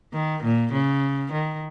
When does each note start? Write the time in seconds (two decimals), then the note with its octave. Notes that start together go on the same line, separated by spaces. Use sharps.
0.13 D#3
0.43 A#2
0.73 C#3
1.32 D#3